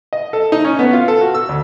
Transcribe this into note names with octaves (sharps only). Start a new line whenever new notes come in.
D#5
A4
D#4
C#4
B3
F4
A4
F#4
E6
D2